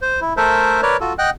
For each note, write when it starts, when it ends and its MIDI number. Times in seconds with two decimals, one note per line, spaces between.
0.02 0.20 72
0.21 0.33 64
0.37 0.81 57
0.37 0.81 69
0.37 0.81 70
0.37 0.81 72
0.37 0.81 76
0.82 0.97 70
0.82 0.97 71
0.82 0.97 73
0.82 0.97 74
1.01 1.13 65
1.01 1.13 66
1.01 1.13 69
1.19 1.30 75
1.19 1.30 78
1.19 1.30 79
1.19 1.30 90